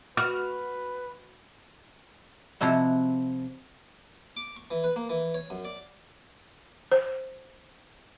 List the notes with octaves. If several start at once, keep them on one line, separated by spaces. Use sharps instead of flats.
F#4 B4 F6
C3 F3 E4 F#4
D6
C#6
E3
B4
A#3
E3
C#5
F#2
D5
C5